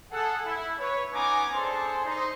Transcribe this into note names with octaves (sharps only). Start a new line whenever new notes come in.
G#4 A4 F#5
E4
B4 C#5
B3 C#4 D#4 G#5 A#5 D6
D4 G#4 A4 C5 C6
D#4 C5